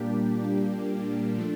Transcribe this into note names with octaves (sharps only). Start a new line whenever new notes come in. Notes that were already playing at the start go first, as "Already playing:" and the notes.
Already playing: A#2 G3 A#3 D4 G4
F3 A3 D4